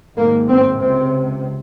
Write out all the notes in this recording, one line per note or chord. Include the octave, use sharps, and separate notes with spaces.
G#1 G#2 A#3
C4
C#2 C3 C4